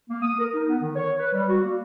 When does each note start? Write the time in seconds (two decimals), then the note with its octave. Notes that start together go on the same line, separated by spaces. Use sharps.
0.10 A#3
0.22 D#6
0.39 A#4
0.54 D#4
0.68 B3
0.81 D#3
0.96 C#5
1.19 B4
1.34 G3
1.49 F#4
1.62 A#3